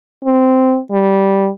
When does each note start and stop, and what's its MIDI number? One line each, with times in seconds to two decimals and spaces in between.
0.25 0.79 60
0.91 1.49 55